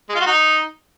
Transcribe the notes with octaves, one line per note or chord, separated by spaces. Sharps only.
G#3
F4
F#4
D#4